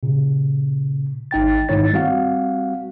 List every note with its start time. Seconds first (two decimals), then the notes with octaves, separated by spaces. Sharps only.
0.03 A#2 C#3
1.31 G#1 D#4 G5 A6
1.69 G#2 D#3 D#4 E4 C#5 A6
1.93 G3 C4 F#4 F5 F#5